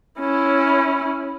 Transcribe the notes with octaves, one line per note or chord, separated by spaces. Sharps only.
C#4 E4